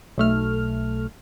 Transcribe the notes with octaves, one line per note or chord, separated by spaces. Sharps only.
B1 A3 F6